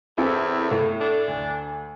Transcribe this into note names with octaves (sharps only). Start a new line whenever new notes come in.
E2 C4 E4 A4
A2
D4
D2